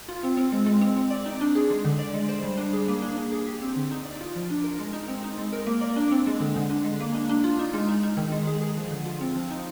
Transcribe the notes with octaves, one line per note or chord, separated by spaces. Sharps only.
F4
C4
C4
G#3
G#3
C4
C4
D5
D#4
D4
G#4
G#3
D3
D5
G#3
C5
G3
D4
G#4
A#3
D4
D4
G#4
G4
C4
D3
D#4
D5
F4
F3
D4
A#4
G#3
D#4
C4
D#4
G#3
A#4
A#3
D5
D4
C4
G#3
D3
D3
D4
G#3
A#3
D4
D4
F4
D#4
G#3
D#4
D#4
D#3
G#3
G#4
G#4
F3
D3
F4
C4
F3
D#4